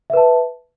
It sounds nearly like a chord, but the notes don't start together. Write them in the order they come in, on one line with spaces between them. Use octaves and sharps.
E5 B4 A5